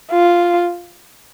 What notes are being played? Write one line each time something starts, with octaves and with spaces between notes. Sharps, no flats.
F4